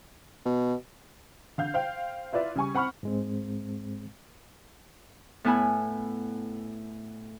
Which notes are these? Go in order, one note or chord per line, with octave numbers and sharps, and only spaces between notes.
B2
D3 F5 G6
C5 F5 G5
E4 F4 B4 D5 E5
C#3 G3 G#5 C#6
C4 F#5 B5 C#6 F6
G#2 G#3 C4
A2 B3 E4 G#5 B5